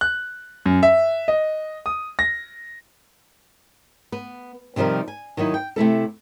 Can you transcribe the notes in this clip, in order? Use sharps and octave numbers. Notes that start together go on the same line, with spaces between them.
F#6
F#2
E5
D#5
D#6
A#6
B3
C3 D#3 F3 G3 A#4
G#5
D#3 F#3 D#4 E4
G5
C3 A3 E4 A4